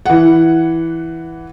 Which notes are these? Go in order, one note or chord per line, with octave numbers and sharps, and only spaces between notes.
E3 F#5